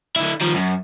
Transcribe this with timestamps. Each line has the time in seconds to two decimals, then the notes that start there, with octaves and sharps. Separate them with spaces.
0.16 D3 E4
0.41 D#3 F3
0.54 F#2